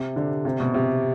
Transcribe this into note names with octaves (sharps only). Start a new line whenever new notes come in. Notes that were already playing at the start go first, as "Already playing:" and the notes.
Already playing: C3
D3
C3
B2
C3